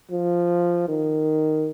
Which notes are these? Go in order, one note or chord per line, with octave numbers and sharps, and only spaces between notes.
F3
D#3